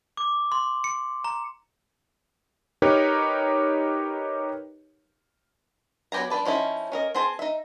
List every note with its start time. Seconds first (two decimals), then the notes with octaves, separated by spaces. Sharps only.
0.17 D6
0.52 C6
0.84 C#7
1.24 A#5
2.82 D#4 G4 A#4 B4 C#5
6.12 F#3 B3 G4 G#5 A#5
6.30 G3 D4 B4 A5
6.45 F3 C#4 D#4 E4
6.92 C#4 A#4 D#5
7.15 C4 G#4 C5 A5
7.39 D#4 E5